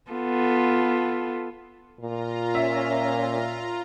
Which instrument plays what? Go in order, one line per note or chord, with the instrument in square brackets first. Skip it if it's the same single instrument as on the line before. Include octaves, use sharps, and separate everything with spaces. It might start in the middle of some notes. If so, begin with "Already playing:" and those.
[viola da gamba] B3 F4 A4
[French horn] A#2 [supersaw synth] F4 A#5
[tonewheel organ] C#4 [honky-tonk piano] E5